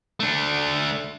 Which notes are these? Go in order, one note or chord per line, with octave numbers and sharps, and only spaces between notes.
A3 D4